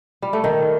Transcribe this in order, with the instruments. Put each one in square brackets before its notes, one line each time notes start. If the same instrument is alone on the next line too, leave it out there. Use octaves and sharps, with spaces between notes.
[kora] G3
A3
D#3